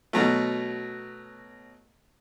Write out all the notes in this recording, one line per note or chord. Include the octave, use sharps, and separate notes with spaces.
B2 F#3 A3